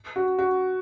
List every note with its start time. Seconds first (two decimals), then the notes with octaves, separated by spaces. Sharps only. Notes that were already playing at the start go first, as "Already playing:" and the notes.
0.16 F#4
0.39 F#4